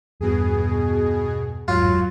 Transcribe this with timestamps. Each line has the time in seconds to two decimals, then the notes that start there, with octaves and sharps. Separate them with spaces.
0.21 E2 G2 B2 G#4
1.68 G1 E2 G#2 F#3 F4